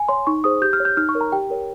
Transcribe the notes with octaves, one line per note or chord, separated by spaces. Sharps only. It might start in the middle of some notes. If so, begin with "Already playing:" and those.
Already playing: G#5
C#5 C6
D#4 C#6
G#4 C5 D#6
G4 G6
F6
C#5
G6
D#4 F6
C#6
A#4 C#5
A#5
G4 G5
A#4 C#5